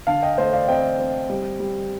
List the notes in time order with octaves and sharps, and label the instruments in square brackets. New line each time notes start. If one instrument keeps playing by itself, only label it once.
[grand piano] D3 F5 A5
D#5 G5
A3 C5 D#5
D5 F5
C4 D#5 G5
C4
G3
G3